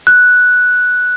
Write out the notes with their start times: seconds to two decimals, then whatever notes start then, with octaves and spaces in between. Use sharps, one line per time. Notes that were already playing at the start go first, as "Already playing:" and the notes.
0.07 F#6